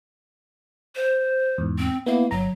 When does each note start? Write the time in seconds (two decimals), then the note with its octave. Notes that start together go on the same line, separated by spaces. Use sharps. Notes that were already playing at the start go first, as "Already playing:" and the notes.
0.96 C5
1.58 E2 G#2
1.78 C4
2.06 A#3 B3 E4
2.31 G1 F#3 A#5